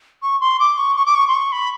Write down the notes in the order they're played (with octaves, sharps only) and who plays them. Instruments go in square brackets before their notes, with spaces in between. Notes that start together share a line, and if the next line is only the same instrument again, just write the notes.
[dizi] C#6
C6
D6
C#6
C#6
D6
C#6
C6
C#6
B5